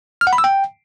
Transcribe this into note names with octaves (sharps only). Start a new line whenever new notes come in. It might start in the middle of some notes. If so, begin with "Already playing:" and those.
F6
F#5
B5
E6
G5